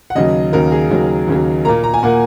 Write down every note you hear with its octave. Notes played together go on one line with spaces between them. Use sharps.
F#5
D#2 C#3 F#3 D#5
D#2 C#3 F#3 A#4
G#4
D#2 C#3 F#3
D#2 C#3 F#3
A#2 A#3 A#5
A#5
G#5
A#2 A#3 F#5